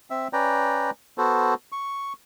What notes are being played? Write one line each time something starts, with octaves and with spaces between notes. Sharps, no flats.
C4 E5
C#4 B4 D5 G5 A#5
B3 F#4 A4 C5
C#6